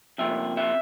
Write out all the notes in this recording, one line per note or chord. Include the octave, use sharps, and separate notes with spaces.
F2 C3 F3 A#3 E5
E5